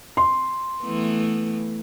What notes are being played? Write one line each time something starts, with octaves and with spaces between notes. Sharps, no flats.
C6
E3 A3 B3